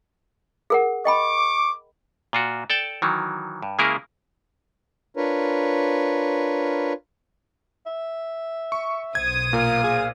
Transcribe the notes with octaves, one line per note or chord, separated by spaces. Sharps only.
G#4 A#4 F#5
D#5 G5 B5 C#6 D6
A#2 F4 F#4
A4 D5 G5 A5
D#3 E3 F#3
G2
C#3 G#3 A#3 E4 G#4 A#4
D4 F4 A#4 B4 C#5
E5
C#6
B1 C5 D#6 G#6
A#2 A#4 F5
G#4